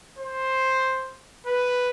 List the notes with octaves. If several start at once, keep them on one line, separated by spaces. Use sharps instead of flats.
C5
B4